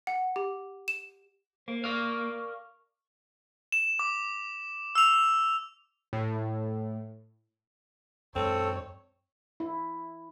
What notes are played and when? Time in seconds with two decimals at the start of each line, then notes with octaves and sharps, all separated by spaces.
0.07 F#5
0.36 G4
0.88 E7
1.68 A#3 C5
1.84 A#4 D5 F5 C#6
3.72 E7
3.99 D6
4.95 E6 F7
6.13 A2
8.36 F#2 G#3 C4 A4 C#5
9.60 E4